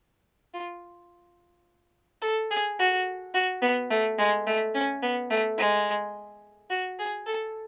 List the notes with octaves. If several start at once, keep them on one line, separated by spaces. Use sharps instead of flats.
F4
A4
G#4
F#4
F#4
B3
A3
G#3
A3
C#4
B3
A3
G#3
F#4
G#4
A4